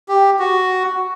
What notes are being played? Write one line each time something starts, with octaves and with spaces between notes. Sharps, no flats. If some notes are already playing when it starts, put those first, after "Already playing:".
G4
F#4